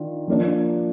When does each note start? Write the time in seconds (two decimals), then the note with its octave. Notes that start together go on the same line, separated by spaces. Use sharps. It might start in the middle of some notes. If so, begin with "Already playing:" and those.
Already playing: D#3 D4 F4
0.28 F3 A#3 D4